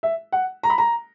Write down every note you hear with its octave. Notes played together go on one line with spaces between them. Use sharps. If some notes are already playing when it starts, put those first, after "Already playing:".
E5
F#5
A#5
B5
A#5